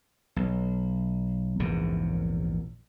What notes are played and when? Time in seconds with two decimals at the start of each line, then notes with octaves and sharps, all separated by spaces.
0.36 B1
1.60 A#1 E2 G#2 C3